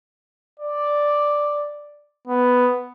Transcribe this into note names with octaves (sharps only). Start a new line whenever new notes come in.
D5
B3